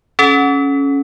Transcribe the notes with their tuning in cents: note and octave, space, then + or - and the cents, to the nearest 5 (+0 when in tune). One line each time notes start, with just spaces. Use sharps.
C#4 +0 A4 -35